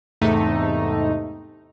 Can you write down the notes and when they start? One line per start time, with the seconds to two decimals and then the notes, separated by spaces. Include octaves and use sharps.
0.21 E2 G#2 C3 A3 D#4